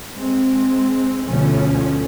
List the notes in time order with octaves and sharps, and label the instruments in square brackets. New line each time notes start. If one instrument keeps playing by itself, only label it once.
[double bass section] G#3 C4
D2 B2 D3 F3 A3 C#4